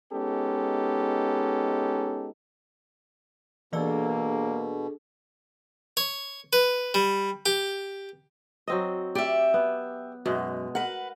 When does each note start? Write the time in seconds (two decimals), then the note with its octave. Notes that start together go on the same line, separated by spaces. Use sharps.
0.13 G#3 B3 C#4 D#4 G4 A4
3.73 B2 E3 A#3 D4 G#4 A4 D5 E6
5.97 C#5
6.53 B4
6.94 G3
7.46 G4
8.68 F#3 C4 D#5
9.15 G4 D5 E5
9.54 B3
10.26 F#2 B2 G#3
10.75 A#4 B4 F#5